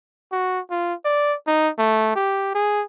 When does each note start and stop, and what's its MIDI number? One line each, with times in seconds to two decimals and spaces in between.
0.32 0.60 66
0.71 0.94 65
1.05 1.35 74
1.47 1.69 63
1.79 2.11 57
2.16 2.52 67
2.55 2.83 68